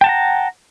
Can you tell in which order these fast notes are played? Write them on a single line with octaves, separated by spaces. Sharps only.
G5 A5 F#5 A#5